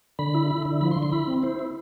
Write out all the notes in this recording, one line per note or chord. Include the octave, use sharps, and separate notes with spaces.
D3 B5
E4
E4
D3
F3 B5
C6
D3
C6
E4 B5
C4
E4 C5
E4